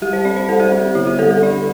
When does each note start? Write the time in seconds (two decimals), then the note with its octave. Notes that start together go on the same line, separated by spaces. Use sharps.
0.02 G3 G4
0.13 C5
0.25 C4 D5
0.36 C5
0.49 G3 A4
0.60 G4
0.72 C4 G4
0.95 D3 E4
1.07 G4
1.19 G3 A4
1.31 A4
1.42 D4 D5